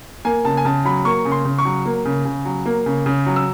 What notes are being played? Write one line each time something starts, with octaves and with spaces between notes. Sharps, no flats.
A#3 G#5
C#3 A5
G#5
C#3 A5
F#3 B5
A#3 C#6
C#3
C6
C#3
C#6
F#3
A#3
C#3
C#3
F#3
A#3
C#3
C#3
F#3
E6